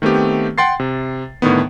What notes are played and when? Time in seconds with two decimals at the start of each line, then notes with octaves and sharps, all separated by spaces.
0.02 D#3 A3 B3 C4 G4
0.58 F#5 G5 C6 A6 C7
0.80 C3
1.42 A2 D3 D#3 B3